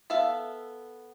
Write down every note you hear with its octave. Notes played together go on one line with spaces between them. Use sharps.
B3 A4 E5 F5